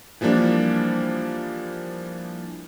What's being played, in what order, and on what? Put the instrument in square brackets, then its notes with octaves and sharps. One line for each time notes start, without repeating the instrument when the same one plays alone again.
[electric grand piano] E3 F3 G3 A#3 D4